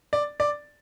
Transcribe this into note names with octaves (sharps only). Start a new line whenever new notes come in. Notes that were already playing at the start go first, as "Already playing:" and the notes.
D5
D5